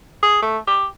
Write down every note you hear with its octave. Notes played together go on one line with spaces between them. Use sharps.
G#4
A3
G4